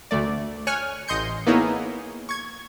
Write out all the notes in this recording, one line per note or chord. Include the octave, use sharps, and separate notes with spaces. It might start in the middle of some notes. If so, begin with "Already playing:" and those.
D2 A3 D5
C#5 G#5 C#6 F6 F#6
A1 D#5 C6 G6 C#7
A#3 B3 D#4 E4 G#4 C#5
C#6 G#6